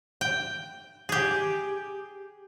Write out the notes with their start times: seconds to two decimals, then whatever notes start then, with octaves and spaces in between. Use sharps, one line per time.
0.21 G5
1.09 G4 G#4